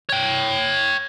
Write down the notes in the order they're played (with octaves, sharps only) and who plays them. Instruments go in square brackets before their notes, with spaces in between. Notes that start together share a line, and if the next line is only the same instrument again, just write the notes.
[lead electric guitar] C#5 G5